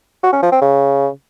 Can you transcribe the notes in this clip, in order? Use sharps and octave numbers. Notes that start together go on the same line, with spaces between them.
F#4
C#4
F3
C4
C#3